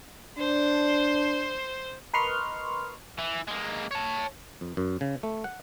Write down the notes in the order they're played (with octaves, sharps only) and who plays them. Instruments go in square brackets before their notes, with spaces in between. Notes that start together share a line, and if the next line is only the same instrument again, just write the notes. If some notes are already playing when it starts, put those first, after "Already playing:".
[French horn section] D4 [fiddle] C5
[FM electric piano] A#4 B4 D#5 C6 C#6 F6
[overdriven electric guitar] E3
G#3 A#3
C#5 A5
[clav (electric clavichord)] F2
F#2
C#3
A3
F#5